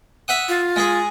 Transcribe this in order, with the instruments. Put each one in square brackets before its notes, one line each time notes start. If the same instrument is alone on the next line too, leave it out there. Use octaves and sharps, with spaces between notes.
[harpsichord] E5 F#5 D#6
[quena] F4
[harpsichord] G#3 G#4